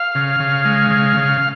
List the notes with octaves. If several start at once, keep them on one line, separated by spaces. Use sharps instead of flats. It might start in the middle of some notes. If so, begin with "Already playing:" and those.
Already playing: F5
C#3
C#3
G#3
C#3
C#3